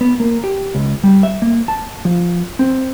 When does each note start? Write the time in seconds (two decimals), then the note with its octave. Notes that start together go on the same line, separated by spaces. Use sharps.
0.01 B3
0.20 A#3
0.44 G4
0.75 C#2
1.04 G3
1.23 E5
1.42 A#3
1.68 A5
2.05 F3
2.59 C4